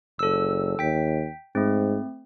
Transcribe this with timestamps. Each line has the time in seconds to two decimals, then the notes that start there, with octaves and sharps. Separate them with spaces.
0.19 F#1 A4 E6
0.79 D#2 G5 B6
1.55 G#2 A3 C4